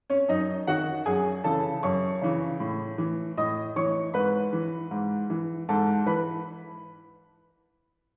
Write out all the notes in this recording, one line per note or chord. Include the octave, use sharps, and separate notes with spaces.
C#4 C#5
F#2 D#4 D#5
D#3 F#4 F#5
F#2 G#4 G#5
C#3 E3 A4 A5
F#2 C#5 C#6
C#3 E3
A2
E3
A2 D#5 D#6
E3 C#5 C#6
G#2 B4 B5
E3
G#2
E3
G#2 A4 A5
E3 B4 B5